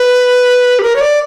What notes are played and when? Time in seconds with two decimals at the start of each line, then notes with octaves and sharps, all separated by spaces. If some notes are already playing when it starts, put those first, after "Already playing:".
Already playing: B4
0.79 G4
0.83 A#4
0.96 C#5
1.01 D5